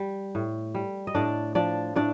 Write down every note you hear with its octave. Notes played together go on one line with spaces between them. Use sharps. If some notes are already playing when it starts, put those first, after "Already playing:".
Already playing: G3
A2
G3
D#5
A2 D4 D5
F3 D4 D5
A2 D4 D5